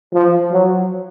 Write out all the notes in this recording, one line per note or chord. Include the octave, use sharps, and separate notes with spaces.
F3
F#3